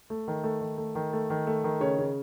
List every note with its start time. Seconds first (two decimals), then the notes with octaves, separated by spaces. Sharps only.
0.10 A3
0.28 D#3
0.44 A3
0.61 D#3
0.78 A3
0.95 D#3
1.13 A3
1.30 D#3
1.47 A3
1.64 D#3
1.80 C#3 C#5
1.99 C#3